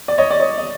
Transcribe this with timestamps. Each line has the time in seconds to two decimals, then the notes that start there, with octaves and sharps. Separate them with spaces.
0.08 D5
0.18 C#5 D#5
0.31 D5
0.40 C#5 D#5
0.58 D#5